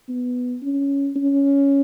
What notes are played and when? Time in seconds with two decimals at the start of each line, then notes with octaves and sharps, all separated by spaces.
0.09 B3
0.62 C#4
1.16 C#4